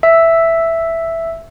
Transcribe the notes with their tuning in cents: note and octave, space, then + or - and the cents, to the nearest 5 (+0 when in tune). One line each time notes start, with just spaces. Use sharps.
E5 +5 E6 +0